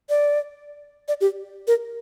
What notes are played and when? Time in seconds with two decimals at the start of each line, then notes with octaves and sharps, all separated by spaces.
0.09 D5
1.08 D5
1.21 G4
1.68 A#4